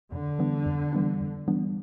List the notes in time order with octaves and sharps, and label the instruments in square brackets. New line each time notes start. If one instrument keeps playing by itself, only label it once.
[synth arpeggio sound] F2 [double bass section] D3
[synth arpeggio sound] E3 G3 B3 D4
F2
E3 G3 B3 D4
F2
E3 G3 B3 D4